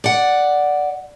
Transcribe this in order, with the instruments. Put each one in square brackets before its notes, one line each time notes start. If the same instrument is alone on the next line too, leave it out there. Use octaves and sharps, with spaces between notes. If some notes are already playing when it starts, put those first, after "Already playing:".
[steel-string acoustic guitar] D5 F#5